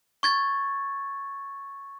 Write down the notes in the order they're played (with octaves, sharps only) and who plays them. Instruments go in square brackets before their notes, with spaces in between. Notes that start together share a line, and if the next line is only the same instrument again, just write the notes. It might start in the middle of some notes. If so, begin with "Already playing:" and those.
[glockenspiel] C#6 G#6 A6